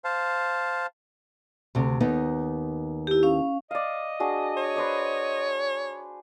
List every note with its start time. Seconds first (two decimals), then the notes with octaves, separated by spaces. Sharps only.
0.05 C5 F5 A5
1.75 D2 C3
2.00 D#2 B3 D#4
3.07 E4 G4
3.23 C#4 F5
3.71 D5 D#5 F5
4.20 D4 F#4 G#4
4.57 C#5
4.76 B4 C5 D5